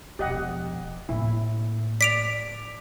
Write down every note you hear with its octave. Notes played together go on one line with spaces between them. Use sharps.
E1 F3 G4 D#5 F#5
A2 A#3 E4
D5 B6 D7 F7